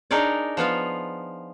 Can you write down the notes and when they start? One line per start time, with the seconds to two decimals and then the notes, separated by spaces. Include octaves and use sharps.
0.11 D4 D#4 G#4 A#4 C#5 D5
0.57 F3 B3 F4 F5